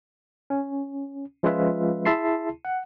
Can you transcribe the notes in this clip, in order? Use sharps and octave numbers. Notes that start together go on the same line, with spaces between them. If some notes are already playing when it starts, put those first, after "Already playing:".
C#4
F3 G#3 C#4 F4 B4 E5
E4 G#4 E5 A5 C6 C7
F#5